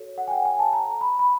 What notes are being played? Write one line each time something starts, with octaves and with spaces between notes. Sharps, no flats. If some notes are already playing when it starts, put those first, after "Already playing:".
Already playing: F#4 A4 C#5
F#5
G#5
G5
G#5
A5
A#5
B5
B5